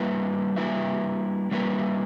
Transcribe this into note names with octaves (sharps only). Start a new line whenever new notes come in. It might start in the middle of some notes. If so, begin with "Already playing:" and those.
Already playing: G3 A#3 E4 B4 E5
G3 A#3 E4 B4 E5
G3 A#3 E4 B4 E5